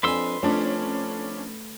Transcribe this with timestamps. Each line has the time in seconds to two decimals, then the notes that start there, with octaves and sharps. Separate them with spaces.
0.03 F2 C4 D4 B4 G#5 C6 E6
0.43 F2 A3 C#4 D4